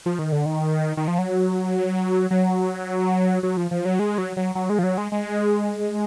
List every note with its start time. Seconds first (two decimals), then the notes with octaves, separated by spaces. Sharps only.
0.06 F3
0.19 D#3
0.32 D3
0.46 D#3
0.97 D#3
1.08 F3
1.18 F#3
2.31 F#3
3.43 F#3
3.57 F3
3.71 F3
3.85 F#3
3.99 G#3
4.18 F#3
4.37 F#3
4.55 F#3
4.70 G#3
4.79 F3
4.83 F#3
4.98 G#3
5.12 G#3